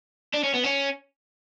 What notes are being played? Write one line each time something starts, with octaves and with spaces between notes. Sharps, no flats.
D4
C#4
B3
C#4